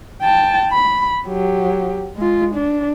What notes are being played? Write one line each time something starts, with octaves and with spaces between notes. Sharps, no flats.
G5 A5
B5
F#3 G4
G#3 F4
D4